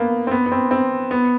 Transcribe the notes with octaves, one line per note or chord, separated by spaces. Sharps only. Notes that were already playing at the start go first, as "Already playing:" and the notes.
Already playing: A#3 B3
C4
B3
B3
C4
C4
B3